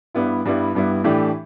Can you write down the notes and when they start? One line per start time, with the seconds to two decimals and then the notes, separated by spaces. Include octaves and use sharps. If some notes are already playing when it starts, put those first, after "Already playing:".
0.14 G2 G3 B3 E4
0.45 G2 G3 B3 E4
0.75 G2 G3 B3 E4
1.04 A2 E3 A3 D4 G4